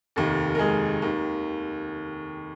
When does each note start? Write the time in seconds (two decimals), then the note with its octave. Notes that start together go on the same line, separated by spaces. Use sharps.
0.16 F1 D#2 D#3
0.55 A#4
0.59 G#3 G#4
1.02 D#2 D#3